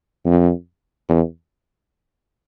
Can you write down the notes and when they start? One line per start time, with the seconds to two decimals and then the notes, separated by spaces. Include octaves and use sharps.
0.25 F2
1.09 E2